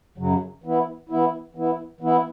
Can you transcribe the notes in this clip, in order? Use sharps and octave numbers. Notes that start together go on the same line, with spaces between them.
F#2 C#3 F#3
E3 B3 E4
E3 B3 E4
E3 B3 E4
E3 B3 E4